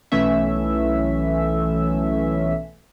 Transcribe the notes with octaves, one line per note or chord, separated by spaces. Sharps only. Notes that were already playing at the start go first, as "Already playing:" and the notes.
B1 E3 A3 C#4 E5